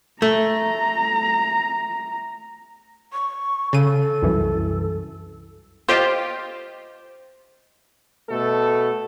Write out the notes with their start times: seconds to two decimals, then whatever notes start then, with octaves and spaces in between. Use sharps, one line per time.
0.22 A3 A#5
3.13 C#6
3.73 C#3 A4 D#7
4.22 C2 F#2 E3
5.89 F4 G4 C5 D#5
8.30 B2 A3 A4